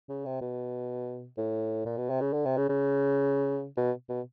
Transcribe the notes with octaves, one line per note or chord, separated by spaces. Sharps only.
C#3
C3
B2
A2
A#2
B2
C3
C#3
D3
C3
C#3
C#3
B2
B2